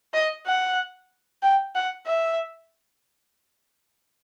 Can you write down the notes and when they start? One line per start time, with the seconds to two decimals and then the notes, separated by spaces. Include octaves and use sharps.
0.14 D#5
0.46 F#5
1.42 G5
1.75 F#5
2.06 E5